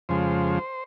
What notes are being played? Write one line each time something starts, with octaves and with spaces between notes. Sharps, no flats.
F2 C#3 F3 G#3 C5